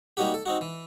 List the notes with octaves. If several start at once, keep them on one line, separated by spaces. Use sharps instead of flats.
G3 A#3 C#4 D#4 F#4 G4
A4
C4 D#4 F#4
E3